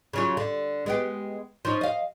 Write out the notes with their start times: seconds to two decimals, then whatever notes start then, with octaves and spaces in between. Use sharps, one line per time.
0.13 C#3 F#3 F4
0.37 D3
0.86 G#3 B3 G4
1.65 F3 C#4 D#4
1.81 D#5 F5